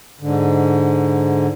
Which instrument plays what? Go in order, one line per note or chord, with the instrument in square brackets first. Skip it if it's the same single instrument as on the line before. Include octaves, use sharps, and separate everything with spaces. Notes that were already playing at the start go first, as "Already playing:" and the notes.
[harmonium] G#2 D3